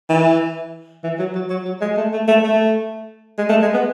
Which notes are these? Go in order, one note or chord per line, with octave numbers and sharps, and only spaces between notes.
E3
E3
F#3
F#3
F#3
F#3
G#3
A3
A3
A3
A3
G#3
A3
G#3
B3